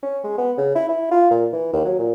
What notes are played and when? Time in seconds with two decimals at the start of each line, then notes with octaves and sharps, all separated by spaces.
0.03 C#4
0.24 G#3
0.38 B3
0.58 C#3
0.75 E4
0.89 E4
1.11 F4
1.31 A#2
1.53 E3
1.73 D#2
1.85 F#3
1.99 A#2